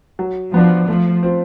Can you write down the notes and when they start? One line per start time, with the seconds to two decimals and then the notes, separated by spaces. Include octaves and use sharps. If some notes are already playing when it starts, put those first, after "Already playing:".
0.19 F#3
0.53 F3 B3 D4
0.88 F3 A3
1.23 C4 F4